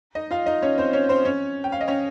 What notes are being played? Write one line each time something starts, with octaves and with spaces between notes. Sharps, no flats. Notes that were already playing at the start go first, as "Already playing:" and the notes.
D#4 D#5
F4 F5
D#4 D#5
C#4 C#5
C4 C5
C#4 C#5
C4 C5
C#4 C#5
G5
F5
D#5
C#4 C#5